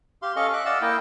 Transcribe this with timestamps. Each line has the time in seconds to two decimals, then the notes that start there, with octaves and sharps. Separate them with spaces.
0.22 G4 F5 C6
0.36 C#4 A4 D#5 F5 C#6
0.53 E5 D6 F#6
0.65 D5 D#5 F5 F#5 E6
0.82 A#3 E4 D#5 G5